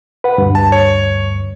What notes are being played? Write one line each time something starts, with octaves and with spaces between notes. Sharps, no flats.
B4 F#5
D2 G2
A5
C#5